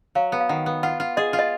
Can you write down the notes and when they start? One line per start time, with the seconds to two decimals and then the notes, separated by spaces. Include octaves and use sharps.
0.15 F#3 F5
0.32 B3
0.40 F5
0.49 D#3 F#5
0.66 B3
0.83 F4 F#5
1.00 F4
1.17 G#4 D#5
1.33 F4
1.39 D#5